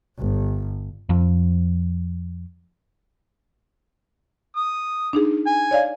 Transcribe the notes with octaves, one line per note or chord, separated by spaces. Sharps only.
G1
F2 F3
D#6
D4 D#4 G#4
G#5
C#5 D5 F5